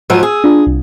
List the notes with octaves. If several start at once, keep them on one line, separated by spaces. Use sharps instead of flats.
G#2 F3 F#3 E6 D#7
G#4
D4 F4
C2